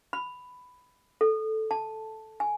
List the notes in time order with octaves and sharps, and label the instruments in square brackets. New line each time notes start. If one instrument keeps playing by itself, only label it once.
[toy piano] B5
A4
A5
G#5